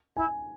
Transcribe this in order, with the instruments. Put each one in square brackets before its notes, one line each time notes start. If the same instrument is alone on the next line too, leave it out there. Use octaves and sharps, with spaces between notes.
[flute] E4 [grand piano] G#5